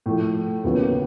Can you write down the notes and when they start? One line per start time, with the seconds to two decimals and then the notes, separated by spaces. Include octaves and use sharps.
0.06 A2 F3 A3
0.64 D#2 C#3 F#3 B3